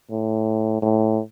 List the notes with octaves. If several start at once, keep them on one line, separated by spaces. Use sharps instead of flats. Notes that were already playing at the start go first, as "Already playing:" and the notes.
A2
A2